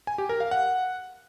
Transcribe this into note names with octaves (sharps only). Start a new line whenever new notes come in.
G#5
G4
A#4
F5
F#5